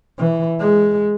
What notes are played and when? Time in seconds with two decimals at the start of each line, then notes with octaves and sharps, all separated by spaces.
0.19 E3
0.61 G#3